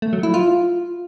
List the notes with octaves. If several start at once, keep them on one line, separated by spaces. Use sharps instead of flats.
A3
F#3
E4
F4